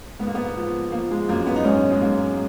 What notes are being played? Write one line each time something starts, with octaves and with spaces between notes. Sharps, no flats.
G#2 B3
A#3
B3
F3
F3 A#3
G#3
F#2 A#3
B3
D#4
G#2 C#4
G#3
G#2 A#3